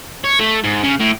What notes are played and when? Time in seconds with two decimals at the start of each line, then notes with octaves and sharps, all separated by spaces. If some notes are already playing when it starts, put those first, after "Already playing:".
0.24 C#5
0.39 A3
0.64 G#2
0.84 C#3
1.00 A2